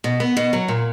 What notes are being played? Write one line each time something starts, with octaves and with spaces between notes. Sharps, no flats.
B2
B3
B2
F#3
A#2